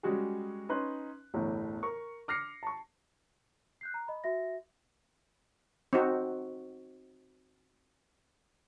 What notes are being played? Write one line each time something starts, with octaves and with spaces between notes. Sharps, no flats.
G3 G#3 C#4 F#4 G#4
C#4 D#4 B4 C6 F#6
G1 E2 A2
A#4 C#6
D6 F6 A#6 C7 C#7
A5 C#6
F#6 G6 C7
A#5
D#5 B5
F#4 E5 A#6
C4 D#4 F#4